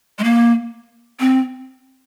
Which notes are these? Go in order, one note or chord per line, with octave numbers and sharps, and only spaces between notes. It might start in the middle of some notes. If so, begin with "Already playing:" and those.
G#3
A#3
C4